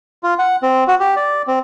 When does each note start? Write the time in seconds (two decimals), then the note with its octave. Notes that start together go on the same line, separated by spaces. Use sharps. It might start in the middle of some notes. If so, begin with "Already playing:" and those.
0.23 F4
0.39 F#5
0.62 C4
0.87 F#4
1.00 G4
1.16 D5
1.47 C4